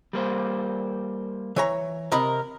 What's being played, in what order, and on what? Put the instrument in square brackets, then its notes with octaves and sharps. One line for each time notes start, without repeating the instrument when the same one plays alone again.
[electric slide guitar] G3 A#3 C5
[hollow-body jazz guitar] E3 C#5 A#5
[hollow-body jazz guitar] C3 D#5 B5 [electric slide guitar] A#4